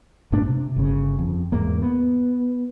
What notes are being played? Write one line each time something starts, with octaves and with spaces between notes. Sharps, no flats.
G2 A#2 A3 D4
C3
G1 C#3
F2
E2 G#2 A#3
B3